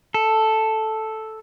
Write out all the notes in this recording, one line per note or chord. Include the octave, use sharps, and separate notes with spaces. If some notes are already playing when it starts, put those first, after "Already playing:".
A4